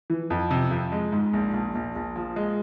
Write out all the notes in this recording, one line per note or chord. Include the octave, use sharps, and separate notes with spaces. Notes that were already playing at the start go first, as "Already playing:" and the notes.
E3
F2
C3
F2
G#3
G#2
A#1
A#1
A#1
A#1
F3
G#3